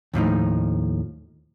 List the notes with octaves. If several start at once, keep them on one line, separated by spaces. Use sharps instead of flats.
D#2 A2 F3 D#4